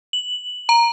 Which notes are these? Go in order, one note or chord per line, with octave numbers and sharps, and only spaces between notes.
F#7
A#5